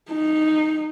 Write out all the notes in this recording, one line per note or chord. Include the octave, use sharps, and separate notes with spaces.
D#4